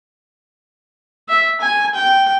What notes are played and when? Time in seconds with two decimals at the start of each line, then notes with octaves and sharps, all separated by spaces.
1.29 E5
1.61 G#5
1.94 G5